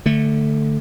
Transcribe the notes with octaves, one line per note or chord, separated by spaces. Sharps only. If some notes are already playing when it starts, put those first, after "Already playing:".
D3 A3